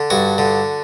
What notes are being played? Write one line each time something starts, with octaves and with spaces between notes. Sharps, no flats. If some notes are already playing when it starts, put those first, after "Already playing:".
Already playing: D3
G2 F#4
D3